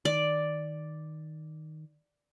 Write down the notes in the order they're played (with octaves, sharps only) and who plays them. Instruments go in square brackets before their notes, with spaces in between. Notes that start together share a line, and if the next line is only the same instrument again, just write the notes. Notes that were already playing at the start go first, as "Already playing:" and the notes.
[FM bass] D#3 [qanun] D5